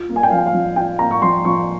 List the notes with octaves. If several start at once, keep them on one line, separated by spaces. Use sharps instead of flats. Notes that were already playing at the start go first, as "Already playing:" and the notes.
Already playing: F4
A#3
G#5
G5
F3 F5
G5
F5
F3
F4 G5
A#3 A#5
C#6
F3 C6
F3 C#6